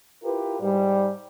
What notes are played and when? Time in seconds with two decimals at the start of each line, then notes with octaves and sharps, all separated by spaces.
0.23 E4 F4 G4 A#4 B4
0.61 G#2 G3